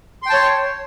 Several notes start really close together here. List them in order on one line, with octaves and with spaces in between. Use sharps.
C6 G5 A5 C#5